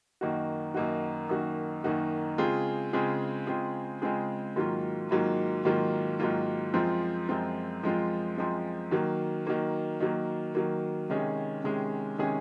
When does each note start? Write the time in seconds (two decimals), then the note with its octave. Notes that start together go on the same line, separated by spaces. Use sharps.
0.21 F#2 D#3 A#3 D#4 F#4
0.74 F#2 D#3 A#3 D#4 F#4
1.29 F#2 D#3 A#3 D#4 F#4
1.84 F#2 D#3 A#3 D#4 F#4
2.38 C#3 G#3 C4 F4 G#4
2.93 C#3 G#3 C4 F4 G#4
3.47 C#3 G#3 C4 F4 G#4
4.02 C#3 G#3 C4 F4 G#4
4.56 G#2 D#3 F#3 A#3 F4
5.11 G#2 D#3 F#3 A#3 F4
5.65 G#2 D#3 F#3 A#3 F4
6.20 G#2 D#3 F#3 A#3 F4
6.74 F#2 F3 G#3 C4 F4
7.29 F#2 F3 G#3 C4 F4
7.83 F#2 F3 G#3 C4 F4
8.37 F#2 F3 G#3 C4 F4
8.91 D#3 F#3 A#3
9.47 D#3 F#3 A#3
10.00 D#3 F#3 A#3
10.55 D#3 F#3 A#3
11.10 C3 D#3 G#3 C#4 G#4
11.64 C3 D#3 G#3 C#4 G#4
12.18 C3 D#3 G#3 C#4 G#4